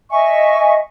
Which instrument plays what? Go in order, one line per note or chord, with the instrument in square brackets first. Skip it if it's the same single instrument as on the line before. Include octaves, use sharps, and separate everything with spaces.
[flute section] D#5 E5 G#5 C#6